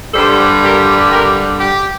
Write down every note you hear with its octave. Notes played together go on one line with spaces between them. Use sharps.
G2 D3 G3 A4 C5
G4 A#4
G4 A#4
G4